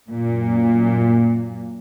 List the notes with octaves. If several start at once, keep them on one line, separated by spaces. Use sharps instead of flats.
F#2 A#2